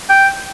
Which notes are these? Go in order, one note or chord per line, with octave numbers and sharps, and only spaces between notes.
G5